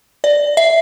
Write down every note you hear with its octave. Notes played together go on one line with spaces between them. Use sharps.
D5
E5